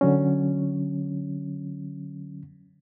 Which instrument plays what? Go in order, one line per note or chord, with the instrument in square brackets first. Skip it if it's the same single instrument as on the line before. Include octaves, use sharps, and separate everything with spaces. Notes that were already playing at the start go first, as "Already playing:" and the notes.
[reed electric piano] D3 F#3 C#4